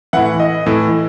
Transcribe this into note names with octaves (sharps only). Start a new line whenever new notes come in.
A2 E3 F#5
D#5
A2 E3